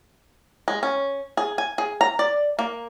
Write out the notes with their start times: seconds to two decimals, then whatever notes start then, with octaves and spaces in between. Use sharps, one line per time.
0.68 G#3
0.83 C#4
1.37 G#4
1.58 G#5
1.78 G#4
2.01 A#5
2.19 D5
2.59 A#3